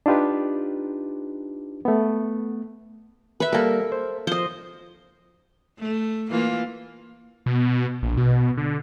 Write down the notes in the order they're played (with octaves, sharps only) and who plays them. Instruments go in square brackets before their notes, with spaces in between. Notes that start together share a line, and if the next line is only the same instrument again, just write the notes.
[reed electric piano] D4 D#4 F4 G4 B4
A3 B3
[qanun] B4 E5
[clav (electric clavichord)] G3 A#3 [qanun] A4 A#4
[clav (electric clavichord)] C5
[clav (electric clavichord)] F3 [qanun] C5 D#5
[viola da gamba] A3
E3 A#3 F4
[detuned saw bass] B2
A#1
B2
D3